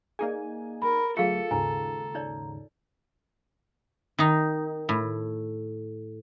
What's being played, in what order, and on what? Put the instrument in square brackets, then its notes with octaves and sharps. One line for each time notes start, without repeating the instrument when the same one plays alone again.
[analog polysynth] A#3 D#4 G#5 [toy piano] G#4 D5
[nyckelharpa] A#4 [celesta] B5
[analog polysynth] D2 F#3 A3 [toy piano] F4 G#4 F5 [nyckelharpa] A4 [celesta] C#7
[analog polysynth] D#2 G#2 C#3 [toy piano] G#5 [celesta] A#5
[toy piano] D#4 C#5 D5
[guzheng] D#3 D#4
A2